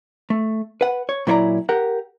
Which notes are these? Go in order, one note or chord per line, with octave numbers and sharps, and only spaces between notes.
A3
B4 F#5
C#5
A#2 F#3 E4 C#5 D5 A#5
G4 A#4 F#5